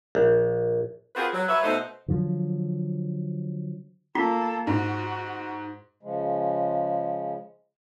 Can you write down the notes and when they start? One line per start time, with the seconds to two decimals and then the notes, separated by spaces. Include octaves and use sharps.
0.15 A#1
1.15 C4 F4 F#4 G#4 A#4 B4
1.34 F#3
1.49 F#3 B4 C#5 E5
1.63 B2 A3 D#4 C5
2.08 D3 F3 F#3
4.15 A#3 F4 A4
4.67 G#2 F#4
6.03 C#3 F3 G#3